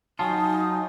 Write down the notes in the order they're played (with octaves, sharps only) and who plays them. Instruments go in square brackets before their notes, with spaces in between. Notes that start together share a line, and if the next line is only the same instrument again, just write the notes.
[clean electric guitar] F#3 F4 [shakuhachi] D#4 [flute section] G#5 D#6 [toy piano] A5